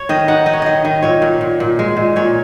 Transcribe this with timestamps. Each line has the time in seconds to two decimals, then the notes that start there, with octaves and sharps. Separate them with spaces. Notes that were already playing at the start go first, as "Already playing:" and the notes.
Already playing: C#5
0.09 D#3 D#5
0.28 D#4 F#5
0.46 D#4 D#5
0.54 C#5
0.62 D#3 D#5
0.85 D#3
1.02 A#2 C#5
1.22 A#2
1.41 A#2
1.60 A#2
1.79 G#3
1.97 A#2
2.16 A#2 C#5